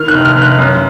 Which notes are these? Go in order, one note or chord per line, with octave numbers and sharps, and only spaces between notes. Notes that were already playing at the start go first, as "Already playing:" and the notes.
Already playing: D#3 F6
F#6
F1
F6
F1
F#6
F#2